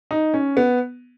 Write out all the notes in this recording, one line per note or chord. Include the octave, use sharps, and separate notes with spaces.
D#4
C#4
B3